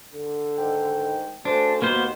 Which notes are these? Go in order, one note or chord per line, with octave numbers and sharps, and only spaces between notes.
D3
G#2 D#3 G5
A3 D4 F#4 G#4 C5
D#2 A#3 B3 F#4 C5